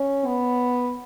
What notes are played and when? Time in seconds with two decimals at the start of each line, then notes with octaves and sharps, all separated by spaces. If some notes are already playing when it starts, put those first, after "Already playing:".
Already playing: C#4
0.26 B3